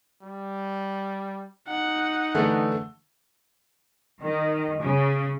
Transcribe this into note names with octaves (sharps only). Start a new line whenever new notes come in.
G3
D#4 F#5
D3 E3 A3
D#3
C#3